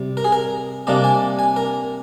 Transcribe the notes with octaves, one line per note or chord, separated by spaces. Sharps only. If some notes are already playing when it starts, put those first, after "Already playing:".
Already playing: C3 G3
A#4
G#4
A#4
C3 G3 A#3 D4 D#5
G#5
G#5
A#4